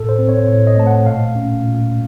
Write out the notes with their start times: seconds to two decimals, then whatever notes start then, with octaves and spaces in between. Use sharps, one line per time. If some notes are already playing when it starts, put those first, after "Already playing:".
Already playing: A2 A4
0.09 C5
0.19 C4
0.29 C#5
0.48 A2 C#5
0.67 D#5
0.77 A3 A5
0.87 F#5
1.06 A#2 F5
1.36 C#4
1.64 A#2